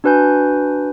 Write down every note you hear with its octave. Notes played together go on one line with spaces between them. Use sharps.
D4 F#4 B4 G#5 G6